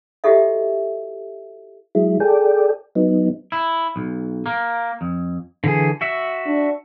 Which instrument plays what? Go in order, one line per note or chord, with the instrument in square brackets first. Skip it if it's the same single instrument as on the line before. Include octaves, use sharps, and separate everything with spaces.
[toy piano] E4 F#4 G4 A4 D#5 E5
[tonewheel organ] F#3 G#3 E4
G#4 A4 D5 G5
F#3 B3 D#4
[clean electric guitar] E4
B1
A#3
F2
[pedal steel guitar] D3 E3 G#4
F#4 E5
[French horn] D4